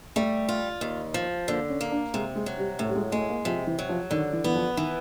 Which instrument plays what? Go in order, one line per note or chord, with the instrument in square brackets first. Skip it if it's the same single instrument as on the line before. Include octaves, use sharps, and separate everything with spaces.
[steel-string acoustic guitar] G3 [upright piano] A3
[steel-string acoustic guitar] F4
D#2
F3
[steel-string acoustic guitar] D3 [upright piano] A#3
[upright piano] C#4
[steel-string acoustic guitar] A#3
[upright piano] D4
[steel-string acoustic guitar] C3 [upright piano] G#3
[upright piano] G#3
[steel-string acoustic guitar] F#3
[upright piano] G3
[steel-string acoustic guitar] A2 [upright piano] A3
[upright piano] G3
G#3
[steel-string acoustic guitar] G#3 [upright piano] A3
[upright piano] A#3
[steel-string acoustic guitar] C3 [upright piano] F3
[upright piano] E3
[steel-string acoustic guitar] F#3
[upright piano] F3
[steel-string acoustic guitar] D3 [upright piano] D#3
[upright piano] E3
[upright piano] E3 [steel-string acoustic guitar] B3
[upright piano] F3
[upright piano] D#3 [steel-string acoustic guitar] E3